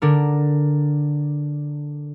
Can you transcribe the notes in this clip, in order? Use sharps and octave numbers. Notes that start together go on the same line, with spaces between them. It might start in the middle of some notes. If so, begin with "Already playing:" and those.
D3 D4 A#4